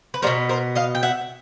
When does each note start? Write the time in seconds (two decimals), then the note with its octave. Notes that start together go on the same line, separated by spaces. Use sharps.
0.14 B4
0.22 G3 B3 A#4 C5
0.27 B2
0.49 A#4 C5
0.75 D#5 F5
0.95 G5
1.03 E5 F#5